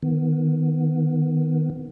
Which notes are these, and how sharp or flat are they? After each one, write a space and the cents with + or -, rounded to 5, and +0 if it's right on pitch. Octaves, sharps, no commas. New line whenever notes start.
D#3 +5 B3 +0